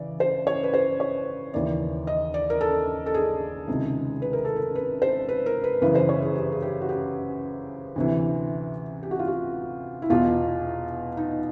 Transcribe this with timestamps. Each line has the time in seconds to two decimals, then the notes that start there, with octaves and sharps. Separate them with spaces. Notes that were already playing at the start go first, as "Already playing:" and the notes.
Already playing: C#3 E3 D5
0.20 C5
0.47 C#5
0.63 B4
0.74 C5
1.00 C#5
1.54 D#2 C#3 E3 D5
2.07 D#5
2.34 D5
2.50 A#4
2.61 A4
3.06 A4
3.14 G#4
3.67 C#2 C3 D#3
4.22 B4
4.33 A#4
4.45 A4
4.56 A#4
4.75 B4
5.02 C5
5.29 B4
5.46 A#4
5.64 B4
5.81 F#2 C#3 E3 B4
5.95 C5
6.09 C#5
6.22 G#4
6.35 G4
6.52 G#4
6.62 G4
6.81 F#4
6.89 G4
7.96 D2 C3 E3
9.03 G4
9.11 F#4
9.19 F4
9.27 F#4
10.02 E4
10.10 E2 B2 F4
11.17 D#4